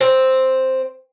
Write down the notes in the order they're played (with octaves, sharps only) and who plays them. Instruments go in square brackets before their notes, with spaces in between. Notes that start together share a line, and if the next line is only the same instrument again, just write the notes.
[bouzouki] C4